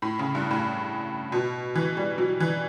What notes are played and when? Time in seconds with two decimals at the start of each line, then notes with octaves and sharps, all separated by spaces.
0.02 A2
0.19 C#3
0.35 G2
0.51 A2
1.32 B2
1.75 E3
1.97 G3
2.18 F#3
2.40 E3